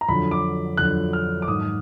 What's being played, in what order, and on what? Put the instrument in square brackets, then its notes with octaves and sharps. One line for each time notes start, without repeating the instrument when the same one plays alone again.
[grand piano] A#5
F2 D3 F#3 B5
D6
F2 D3 F#3 F#6
F6
D6
G#2 D#3 F#3 D#6